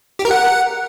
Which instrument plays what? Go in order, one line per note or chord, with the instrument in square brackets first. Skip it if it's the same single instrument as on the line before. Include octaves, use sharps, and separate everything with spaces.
[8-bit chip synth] G4
A#4
F#5